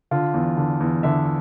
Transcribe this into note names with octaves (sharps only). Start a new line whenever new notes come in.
D3 F4
E2
D3
E2
D3 E5